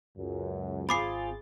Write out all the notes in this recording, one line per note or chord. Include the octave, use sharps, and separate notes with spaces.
C#2 F#2
G#1 C4 F4 G#4 B5 D6 A6 C7